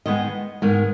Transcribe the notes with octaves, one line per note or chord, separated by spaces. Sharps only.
G#2 D#3 G#3 B3 D#5
G#2 D#3 G#3 B3